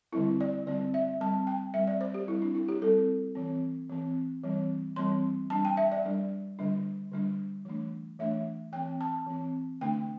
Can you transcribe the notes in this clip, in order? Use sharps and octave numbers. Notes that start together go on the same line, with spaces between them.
D3 G3 C4 E4
D5
D3 G3 C4 D5
E5
G3 C4 A5
G5
G3 C4 E5
D5
C5
G4
G3 C4 E4
D4
E4
G4
G3 C4 A4
E3 C4
E3 C4
E3 G3 C4
E3 G3 C4 C6
G3 D4 A5
G5
E5
D5
G3 D4
D3 G3 D4
D3 G3 D4
E3 A3 D4
E3 A3 D4 E5
E3 C4 G5
A5
E3 C4
D3 A3 D4 G5